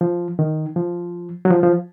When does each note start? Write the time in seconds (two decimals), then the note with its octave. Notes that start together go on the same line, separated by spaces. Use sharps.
0.01 F3
0.39 D#3
0.76 F3
1.45 F#3
1.50 F3
1.63 F3